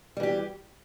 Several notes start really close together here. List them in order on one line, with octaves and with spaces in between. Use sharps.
G3 E3 G4